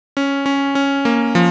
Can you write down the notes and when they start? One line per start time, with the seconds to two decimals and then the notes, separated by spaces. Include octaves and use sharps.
0.17 C#4
0.46 C#4
0.75 C#4
1.05 A#3
1.35 F3